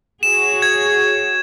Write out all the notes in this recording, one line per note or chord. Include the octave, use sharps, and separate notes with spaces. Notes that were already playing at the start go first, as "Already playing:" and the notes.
F#4 G#4 C#5 E7
G#6